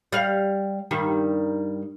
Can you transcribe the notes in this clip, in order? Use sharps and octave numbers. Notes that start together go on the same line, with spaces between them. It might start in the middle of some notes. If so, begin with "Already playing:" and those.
G3 F5
G2 D#3 G3